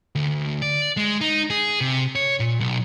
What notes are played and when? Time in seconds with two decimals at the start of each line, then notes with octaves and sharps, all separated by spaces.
0.15 D2
0.62 D5
0.97 G#3
1.21 D#4
1.50 G#4
1.81 C3
2.15 C#5
2.40 A#2
2.61 B1